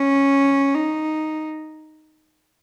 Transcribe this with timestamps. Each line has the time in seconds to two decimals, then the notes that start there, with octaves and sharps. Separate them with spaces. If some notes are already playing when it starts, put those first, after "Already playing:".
Already playing: C#4
0.74 D#4